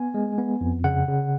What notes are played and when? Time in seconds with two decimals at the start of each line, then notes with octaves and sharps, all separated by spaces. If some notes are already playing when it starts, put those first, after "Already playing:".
Already playing: B3 G#5
0.14 G#3
0.38 B3
0.61 F2
0.84 C#3 F#5
1.08 C#3